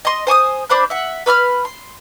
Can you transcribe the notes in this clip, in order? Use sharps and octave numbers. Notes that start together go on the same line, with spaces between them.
D#5 C6
C5 G#5 C#6 D#6
D4 C5 B5 F#6
E5 F#5
B4 B5 E6 F6
C6